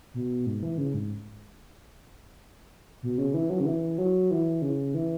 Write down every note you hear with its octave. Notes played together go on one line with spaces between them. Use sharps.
B2
G#2
E3
C#3
G#2
B2
C#3
E3
F#3
C#3
E3
F#3
E3
C#3
E3